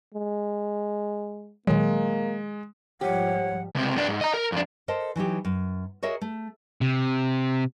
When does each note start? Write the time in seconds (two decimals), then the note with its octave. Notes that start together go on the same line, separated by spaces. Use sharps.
0.14 G#3
1.67 A#2 D#3 F#3 G#3 A#3
3.01 G#2 F3 G3 G4 C#5 F#5
3.75 C#2 C3
3.96 F#2 D4
4.08 G#2
4.21 D#5 A#5
4.34 A#4
4.52 F2 D4
4.88 A4 A#4 C5 D#5 A5
5.16 E3 F#3 D#4 G4
5.45 F#2
6.03 F#4 G#4 A#4 C#5 D#5 E5
6.21 A3
6.81 C3